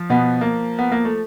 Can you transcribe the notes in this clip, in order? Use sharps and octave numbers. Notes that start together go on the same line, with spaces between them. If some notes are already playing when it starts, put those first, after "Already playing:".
Already playing: F3
B2 B3
A#3
B3
A#3
A3